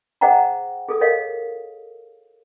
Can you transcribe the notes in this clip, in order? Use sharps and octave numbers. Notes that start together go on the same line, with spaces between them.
G#4 C5 D#5 F#5 G5 A#5
G#4 A4 D#6
A#4 C#5 D#5 F5